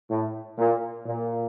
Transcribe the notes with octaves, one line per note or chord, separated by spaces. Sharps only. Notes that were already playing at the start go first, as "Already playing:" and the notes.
A2
A#2
A#2